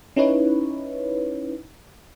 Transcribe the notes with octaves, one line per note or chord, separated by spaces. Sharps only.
C#4 D#4 E4 B4 C#5